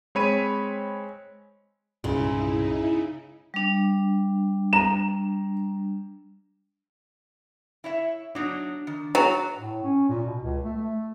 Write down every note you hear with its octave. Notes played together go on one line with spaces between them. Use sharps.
G#3 C4 C#5 B5 B6 D#7
C2 G2 A#2 C#3 G#3 D#4 E4
G3 D4
A#5 E7
E4 C#5 E5
F#3 D4 D#4
D#3
F#3 B3 F#4 G#4
A2
C#4
A#2
B2
C#2
A3
A3